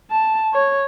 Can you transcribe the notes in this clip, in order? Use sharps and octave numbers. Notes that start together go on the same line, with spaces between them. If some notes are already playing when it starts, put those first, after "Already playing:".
A5
C#5